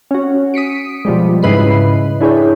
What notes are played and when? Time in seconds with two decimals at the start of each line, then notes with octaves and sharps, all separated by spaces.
0.11 C#4 F#4
0.54 D#6 B6 C#7 D7
1.05 B2 F3 G3 G#3
1.43 G#2 C#3 E4 B4 D#5 C7
2.21 D4 E4 G#4 C#5 G5